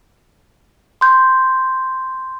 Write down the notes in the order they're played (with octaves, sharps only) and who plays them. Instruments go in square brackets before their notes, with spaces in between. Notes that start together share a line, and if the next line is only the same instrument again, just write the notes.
[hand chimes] C6 G6